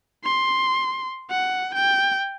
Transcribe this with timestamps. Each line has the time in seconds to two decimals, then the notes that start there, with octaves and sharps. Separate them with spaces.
0.24 C6
1.30 F#5
1.75 G5